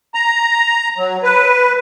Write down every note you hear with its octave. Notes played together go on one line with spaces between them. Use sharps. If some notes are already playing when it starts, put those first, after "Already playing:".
A#5
F#3
B4